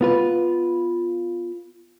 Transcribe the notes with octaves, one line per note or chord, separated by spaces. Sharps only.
B3 F4 B4